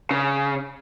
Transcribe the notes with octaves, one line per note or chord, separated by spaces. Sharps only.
C#3